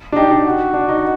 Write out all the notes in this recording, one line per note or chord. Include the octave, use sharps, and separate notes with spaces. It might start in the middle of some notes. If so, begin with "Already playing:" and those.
D4
D#4 G4
D4
F#4
D4
D#4